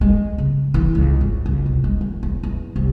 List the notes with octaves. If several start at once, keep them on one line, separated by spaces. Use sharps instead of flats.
G#3
C#3
E3
C#2
G#1
C#2
C3
G#3
E3
E2
E2
C2